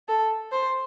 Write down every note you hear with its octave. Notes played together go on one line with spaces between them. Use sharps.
A4
C5